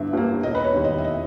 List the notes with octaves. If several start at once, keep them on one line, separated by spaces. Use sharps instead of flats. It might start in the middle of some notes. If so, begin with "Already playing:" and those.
Already playing: G1 G2 G3 E5
G2 G3 A#3
E1 D#5
B4
C#5
D#2 D#3 G3
D#5
E5
D#5